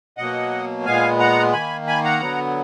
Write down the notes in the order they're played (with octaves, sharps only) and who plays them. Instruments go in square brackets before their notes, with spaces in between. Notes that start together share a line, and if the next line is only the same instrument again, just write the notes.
[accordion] B2 F#3 A#3 D#5 F#5
A#2 G#3 B3 F5 G#5
F#5 A#5
D#3 A#3 G#5 B5
G#5 B5
F#5 A#5
D3 F#3 B3